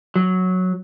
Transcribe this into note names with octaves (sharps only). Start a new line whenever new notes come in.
F#3